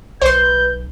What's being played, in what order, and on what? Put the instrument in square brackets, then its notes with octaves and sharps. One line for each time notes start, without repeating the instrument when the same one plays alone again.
[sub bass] B1 [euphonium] B4 [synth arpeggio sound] C5 C6 [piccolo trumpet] G6